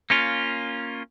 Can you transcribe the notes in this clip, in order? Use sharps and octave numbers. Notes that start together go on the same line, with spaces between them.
A#3 C#4 F4